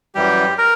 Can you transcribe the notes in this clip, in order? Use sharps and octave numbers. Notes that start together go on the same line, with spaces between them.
F#2 E3 G3 G4
A#4